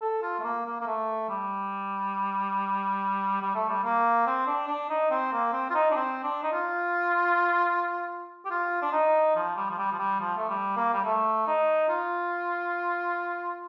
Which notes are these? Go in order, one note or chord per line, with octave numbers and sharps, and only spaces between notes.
A4
F4
A3
A#3
A#3
A#3
A3
G3
G3
A3
G3
A#3
C4
D4
D4
D#4
C4
A#3
C4
F4
D#4
D4
C4
D4
D#4
F4
G4
F4
D4
D#4
F3
G3
F3
G3
F3
G3
F3
A3
G3
A#3
G3
A3
D#4
F4